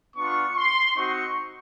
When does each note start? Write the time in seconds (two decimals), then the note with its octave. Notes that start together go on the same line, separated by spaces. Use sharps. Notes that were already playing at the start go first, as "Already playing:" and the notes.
0.17 B3 D4 F4 C#6
0.57 C6
0.96 C4 D#4 F#4 C#6